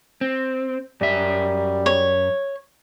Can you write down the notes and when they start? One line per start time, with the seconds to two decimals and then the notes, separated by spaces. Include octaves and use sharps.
0.21 C4
1.01 F#2 G3 E5
1.86 C#5